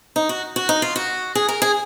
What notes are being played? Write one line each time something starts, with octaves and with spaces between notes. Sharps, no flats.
D#4
F#4
F#4
D#4
F4
F#4
G#4
A#4
G#4